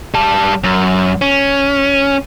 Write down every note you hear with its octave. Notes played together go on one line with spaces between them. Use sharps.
G3 A5
F#2
C#4